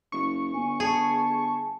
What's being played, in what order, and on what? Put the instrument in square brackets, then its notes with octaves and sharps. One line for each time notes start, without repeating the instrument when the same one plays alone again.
[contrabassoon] F#1 [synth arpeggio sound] C#6
[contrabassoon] G1 [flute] G#5
[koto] G#4 [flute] A5